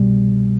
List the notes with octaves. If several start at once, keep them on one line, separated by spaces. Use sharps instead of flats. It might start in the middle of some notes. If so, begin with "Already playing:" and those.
Already playing: C2 B2 G3